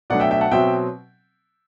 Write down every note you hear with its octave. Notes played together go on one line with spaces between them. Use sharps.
B2 F#3 A3 D4 D5 F#5
E5 G5
E5 G5
F#5 A5
B2 F#3 C4 E5 G5